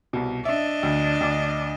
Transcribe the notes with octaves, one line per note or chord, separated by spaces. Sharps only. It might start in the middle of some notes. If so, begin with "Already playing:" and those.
C2 B2
D4 D#5 E5
D2
D2 D6